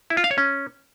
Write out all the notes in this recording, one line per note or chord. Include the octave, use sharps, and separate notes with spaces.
E4
F4
F5
C#5
C#4